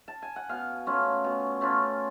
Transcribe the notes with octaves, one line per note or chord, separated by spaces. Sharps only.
A5
G#5
F#5
B2 F5
A3 C#4 F4
B2
A3 C#4 F4